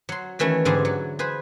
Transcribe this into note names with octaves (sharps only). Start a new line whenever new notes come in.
F#3 C6
D#3 E3 A3 C#4 E4
G#2 D3 G3 G#4 C6
F#3
G#4 B4 C5